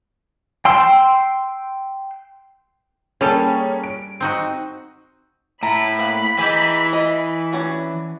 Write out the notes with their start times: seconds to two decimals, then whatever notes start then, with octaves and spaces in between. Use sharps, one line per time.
0.65 G5 C6 E6
3.21 G3 A#3 C#4 G#4 A4
3.84 D7
4.20 C4 D#4 F#4
5.63 A2 A#5 B5
5.99 A#3 F5 F#5
6.39 E3 D#4 G4 G#4
6.93 D#5
7.53 C#4 D4 F#4